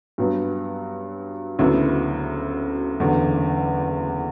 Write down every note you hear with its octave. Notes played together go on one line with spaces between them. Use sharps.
G2 F#3 B3
D2 C#3 F#3 B3 E4
F#1 E2 D3